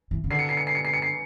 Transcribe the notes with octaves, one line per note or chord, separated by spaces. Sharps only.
E3
C#3
D3 C7
C#7
C7
C#7
C7
C#7
C7
C#7
C7